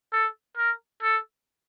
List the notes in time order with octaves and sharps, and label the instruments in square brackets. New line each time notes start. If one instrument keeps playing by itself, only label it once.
[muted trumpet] A4
A#4
A4